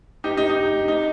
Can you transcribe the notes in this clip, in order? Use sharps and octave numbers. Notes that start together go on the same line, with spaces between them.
D#4 G4
D#4
D#4
D#4